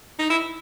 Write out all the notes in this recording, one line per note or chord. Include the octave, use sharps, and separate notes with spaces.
D#4
E4